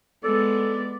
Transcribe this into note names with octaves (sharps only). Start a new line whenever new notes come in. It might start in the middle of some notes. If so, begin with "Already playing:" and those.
G#3 B3 A4 D5